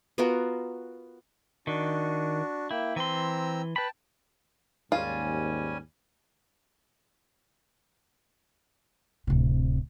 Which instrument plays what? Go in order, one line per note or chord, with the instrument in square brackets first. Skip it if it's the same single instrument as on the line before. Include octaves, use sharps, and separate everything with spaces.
[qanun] B3 F4 F#4 A#4
[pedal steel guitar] D#3 [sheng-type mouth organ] D4 F#4
[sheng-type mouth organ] A#3 G5 [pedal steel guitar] E4
[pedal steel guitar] E3 C6 [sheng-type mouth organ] C4 A#5 E6
[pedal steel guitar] B4 B5 [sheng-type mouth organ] G5 A5
[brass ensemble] D#2 G#2 [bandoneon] G3 C#4 G#5 [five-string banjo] F4
[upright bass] D1 C3